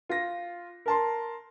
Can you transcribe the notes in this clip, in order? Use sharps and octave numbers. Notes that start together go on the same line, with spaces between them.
F4 A#6
A#4 A5 C6